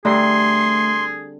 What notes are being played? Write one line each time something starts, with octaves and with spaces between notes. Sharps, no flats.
D3 G3 A3 C4 G#4 C6